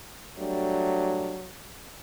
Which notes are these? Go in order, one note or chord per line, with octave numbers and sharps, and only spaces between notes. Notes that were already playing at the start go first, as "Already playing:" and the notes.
F#3 G3 A3 D4